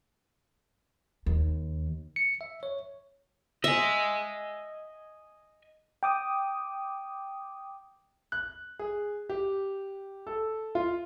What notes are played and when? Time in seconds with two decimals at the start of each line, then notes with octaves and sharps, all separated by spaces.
1.26 D#2
2.16 C#7
2.41 E5
2.63 C#5
3.64 D#5 E5 G#5
6.03 G5 D6 D#6
8.32 F#6
8.79 G#4
9.29 G4
10.27 A4
10.75 F4